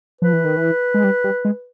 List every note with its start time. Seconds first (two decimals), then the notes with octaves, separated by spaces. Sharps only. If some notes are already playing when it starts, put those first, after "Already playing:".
0.21 F3 B4
0.33 E3
0.45 D#3
0.57 E3
0.94 G#3
1.04 G3
1.24 G3
1.45 G#3